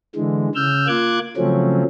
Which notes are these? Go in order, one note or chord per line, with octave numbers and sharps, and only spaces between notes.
D3 E3 G#3
C#3 E6 F6 G6
A#3 F4 D6 F#6 G#6
C#3 F3 F#3 A3 C4 C#4